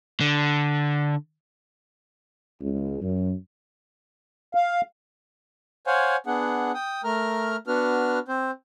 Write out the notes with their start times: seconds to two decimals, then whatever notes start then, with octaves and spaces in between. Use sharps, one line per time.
0.21 D3
2.61 C#2
3.01 F#2
4.55 F5
5.87 C5 C#5 F5 F#5 G#5
6.27 B3 D4 G#4 F#5
6.74 G5 D#6
7.04 A3 A#4 A#5 F6
7.67 B3 D4 F#4 B4 F6
8.28 C4 C5